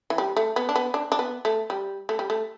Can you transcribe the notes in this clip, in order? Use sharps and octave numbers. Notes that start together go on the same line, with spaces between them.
E3
G3
A3
B3
D4
B3
D4
D4
B3
A3
G3
A3
G3
A3